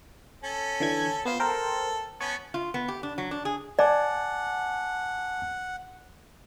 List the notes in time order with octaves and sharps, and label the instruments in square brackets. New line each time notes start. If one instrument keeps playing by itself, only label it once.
[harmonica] C#4 A4
[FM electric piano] D3 E3 G#6
[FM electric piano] B3 F4 [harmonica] C5
[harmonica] A4 [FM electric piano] A#4 C5 G5
[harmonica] B3 C#4 [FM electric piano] A5 C#6 G#6
[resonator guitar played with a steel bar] F4
B3
G4
D4
F#3
D4
G#4
[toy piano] D5 [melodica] F#5 [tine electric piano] G#5 A5 D6